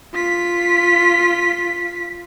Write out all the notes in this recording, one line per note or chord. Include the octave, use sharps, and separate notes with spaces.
F4 B6